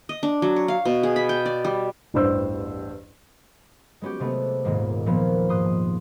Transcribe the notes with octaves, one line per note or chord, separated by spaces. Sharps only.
D#5
D4
F#3
C#5
F5
B2
G#4
B5
G5
D5
G3
A1 E2 G2 G3 C5 E6
G#3 B3 C#4 F#4 G4
C3 G#3 A3 B3
D#1 G#2 G#3 A#3
A#2 F3 A#3 B3
G#2 C6 D#6 F#6